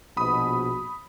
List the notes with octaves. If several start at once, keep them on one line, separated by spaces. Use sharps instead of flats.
A#1 B2 B5 D#6